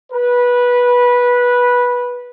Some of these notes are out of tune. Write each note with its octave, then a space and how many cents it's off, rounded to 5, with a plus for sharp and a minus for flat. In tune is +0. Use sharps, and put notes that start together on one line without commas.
B4 -15